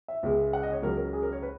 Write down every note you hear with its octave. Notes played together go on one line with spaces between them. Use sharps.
E5
C#2 C#3 G#3
F#5
D#5
C#5
C#2 C#3 F#3 A#4
A#4
G#4
A#4
C#5
B4